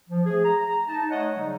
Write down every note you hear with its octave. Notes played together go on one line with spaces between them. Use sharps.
F3
A3 G#4
A#5
D#4 A5
A3 C#5 D#5 F#5
C#3 F#3 G3 A3 D#4